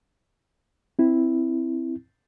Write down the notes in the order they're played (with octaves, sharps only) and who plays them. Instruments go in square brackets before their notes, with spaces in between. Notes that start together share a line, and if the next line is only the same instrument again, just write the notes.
[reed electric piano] C4 E4